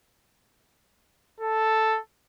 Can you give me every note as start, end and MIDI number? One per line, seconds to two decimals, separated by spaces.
1.40 1.98 69